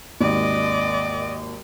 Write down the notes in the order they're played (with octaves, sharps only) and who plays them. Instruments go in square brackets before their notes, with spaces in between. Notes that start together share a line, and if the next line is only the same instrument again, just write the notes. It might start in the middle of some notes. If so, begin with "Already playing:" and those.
[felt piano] G#1 D#2 [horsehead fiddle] D5 D#5